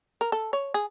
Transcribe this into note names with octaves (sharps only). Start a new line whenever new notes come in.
A#4
A4
C#5
G#4